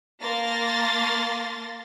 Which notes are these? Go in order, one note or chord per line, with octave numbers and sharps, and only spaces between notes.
A#3 F5 A5 C6 A6 A#6